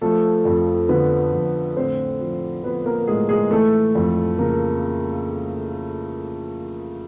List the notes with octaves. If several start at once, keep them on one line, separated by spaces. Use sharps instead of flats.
F3 A3 A4
F2
D3 B3 B4
F2
A2 C4 C5
F3
F3 B3 B4
A#3 A#4
A2 G#3 G#4
G#3 G#4
E3 A3 A4
F2
C#3 A#3 A#4